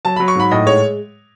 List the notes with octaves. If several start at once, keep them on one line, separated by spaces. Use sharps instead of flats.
F#3 A5
F#3 B5
C#6
G#2 B5
A2 D#5
G#3 C#5